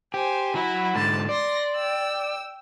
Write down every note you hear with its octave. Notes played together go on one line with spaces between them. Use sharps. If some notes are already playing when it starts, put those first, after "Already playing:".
G4 C5 G#5
F#3 E4 F#4
G#2 D3 A5
D5 C6 A#6
G5 E6